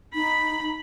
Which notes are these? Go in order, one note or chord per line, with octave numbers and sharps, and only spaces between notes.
D#4 B5